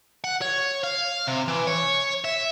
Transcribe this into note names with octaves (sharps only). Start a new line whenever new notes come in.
F#5
C#5
F5
C3
E3
C#5
E5